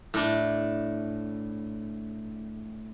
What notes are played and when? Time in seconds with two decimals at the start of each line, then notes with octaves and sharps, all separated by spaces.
0.14 A2 D4